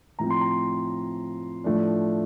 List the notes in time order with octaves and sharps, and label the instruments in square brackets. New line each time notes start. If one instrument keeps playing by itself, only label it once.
[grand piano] A2 F3 C4 A#5
C6
A#5
A2 F3 A3 D4